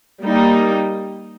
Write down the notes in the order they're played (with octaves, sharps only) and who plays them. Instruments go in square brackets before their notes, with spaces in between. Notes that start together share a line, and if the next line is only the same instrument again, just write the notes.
[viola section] G3 A#3 D#4